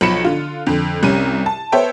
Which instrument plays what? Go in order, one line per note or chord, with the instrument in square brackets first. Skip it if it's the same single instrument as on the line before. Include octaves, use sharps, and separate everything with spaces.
[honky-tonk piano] B1 F3 B5 C#7 E7
D3 F4
F2 D3
C2 C3 C#4 D#7
A5
B3 A4 C5 C#5 E5 G5